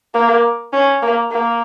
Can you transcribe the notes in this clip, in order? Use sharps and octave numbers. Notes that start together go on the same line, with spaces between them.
A#3
C#4
A#3
A#3